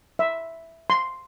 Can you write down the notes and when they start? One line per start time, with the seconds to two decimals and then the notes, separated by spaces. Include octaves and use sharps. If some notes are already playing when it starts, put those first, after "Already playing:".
0.19 E5
0.90 C6